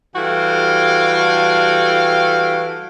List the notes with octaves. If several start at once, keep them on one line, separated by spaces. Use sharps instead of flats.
E3 G3 F#4 A4 F5 G5